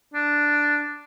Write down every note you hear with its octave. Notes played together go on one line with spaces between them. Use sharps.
D4